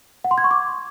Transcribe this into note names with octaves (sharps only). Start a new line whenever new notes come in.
F#5
C6
G#6
C#6
D6